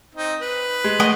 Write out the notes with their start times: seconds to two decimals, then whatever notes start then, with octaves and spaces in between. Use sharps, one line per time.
0.15 C4 D#4
0.41 B4
0.84 G#3
1.00 A3 D#5 F#5